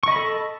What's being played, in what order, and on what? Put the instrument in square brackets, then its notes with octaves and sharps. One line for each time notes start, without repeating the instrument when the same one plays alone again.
[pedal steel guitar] C#6
D#5
B5
A4